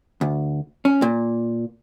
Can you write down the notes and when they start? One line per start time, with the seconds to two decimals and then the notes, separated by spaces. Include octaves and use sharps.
0.21 D2
0.85 C#4
1.02 A#2